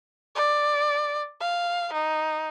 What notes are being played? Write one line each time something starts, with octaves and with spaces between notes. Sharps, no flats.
D5
F5
D#4